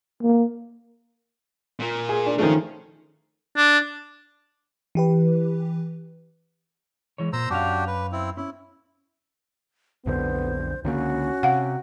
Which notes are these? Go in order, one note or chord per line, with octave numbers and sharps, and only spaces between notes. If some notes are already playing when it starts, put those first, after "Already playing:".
A#3
A#2 A#3
G#4
D4
D#3 F3 A3 C#4 G#4
D4
E3 G4 B4
E3 G#3 C#5
A#2 C5 A#5 E6
F#2 C#4 D4 F#4 G4 F5
B4
C4 E4
C#4 E4
B1 F2 D3 B3 C5
C#2 D3 A#3 C#4 F#4
C3 F5 F#5